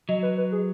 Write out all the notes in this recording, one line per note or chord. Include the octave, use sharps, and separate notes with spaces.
F#3 D#5
B4
B4
G#4